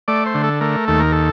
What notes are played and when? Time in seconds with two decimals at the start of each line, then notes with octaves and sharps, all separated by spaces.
0.08 A3 D5
0.26 C5
0.34 D3
0.44 A4
0.61 A3 A#4
0.88 D#2 A4
1.00 A#4
1.12 A4